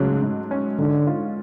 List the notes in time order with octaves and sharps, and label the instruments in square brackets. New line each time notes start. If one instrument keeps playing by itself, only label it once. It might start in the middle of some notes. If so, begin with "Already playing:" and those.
Already playing: [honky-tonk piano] G#2 F#3 A3 [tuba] C#3
[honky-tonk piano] G#2
C#4
[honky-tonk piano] G#2 [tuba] D3
[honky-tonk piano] F4